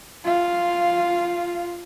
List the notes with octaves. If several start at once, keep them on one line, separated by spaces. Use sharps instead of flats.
F4 F5